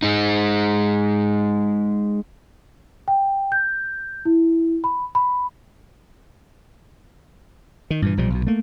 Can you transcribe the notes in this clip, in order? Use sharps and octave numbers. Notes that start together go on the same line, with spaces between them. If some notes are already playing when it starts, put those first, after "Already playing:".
G#3 D#4
G5
G6
E4
B5
B5
D#3
G2 A#2 E3
B1 A#2 F3 G3
B1 B2
A3 A#3